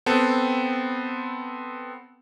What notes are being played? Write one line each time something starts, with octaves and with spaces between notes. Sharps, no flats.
B3 C4 A4